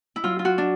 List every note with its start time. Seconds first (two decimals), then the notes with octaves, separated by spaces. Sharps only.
0.16 E4
0.24 F#3 F4
0.39 F4
0.45 F#4
0.58 D4